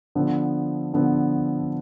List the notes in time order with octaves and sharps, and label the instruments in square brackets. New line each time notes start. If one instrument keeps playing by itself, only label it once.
[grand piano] D3 F3 B3
D3 F3 B3